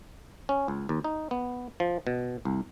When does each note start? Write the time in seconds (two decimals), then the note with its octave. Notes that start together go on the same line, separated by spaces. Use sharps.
0.49 C#4
0.68 C#2
0.89 D#2
1.04 D#4
1.31 B3
1.80 F3
2.07 B2
2.45 C2